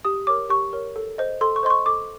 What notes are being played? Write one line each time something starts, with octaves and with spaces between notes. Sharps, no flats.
G4 D#6
A#4 C#5 D6
G4 C#6
A#4 C#5
A4
C5 D#5
A4 C6
C#6
C5 D#5 C6
C#6
A4 D6